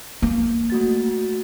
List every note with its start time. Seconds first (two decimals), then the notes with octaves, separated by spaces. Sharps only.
0.22 A#3
0.70 A3 F#4 A6